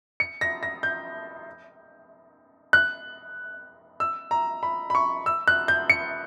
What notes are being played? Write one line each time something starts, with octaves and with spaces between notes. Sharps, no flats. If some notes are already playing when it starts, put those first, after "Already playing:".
C#7
A#6
A#6
G6
F#6
E6
A#5
B5
B5
C#6
E6
F#6
G6
C#7